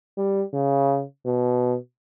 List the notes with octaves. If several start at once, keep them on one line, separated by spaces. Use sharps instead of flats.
G3
C#3
B2